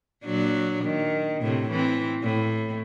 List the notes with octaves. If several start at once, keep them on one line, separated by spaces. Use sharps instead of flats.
A#2 F#3 D4
D#3
A2 C3
E3 C4
A2